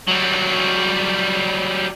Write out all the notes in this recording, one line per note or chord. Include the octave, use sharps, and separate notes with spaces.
F#3 G3